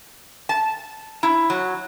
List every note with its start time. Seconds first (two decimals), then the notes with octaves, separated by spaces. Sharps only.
0.49 A5
1.23 E4
1.50 F#3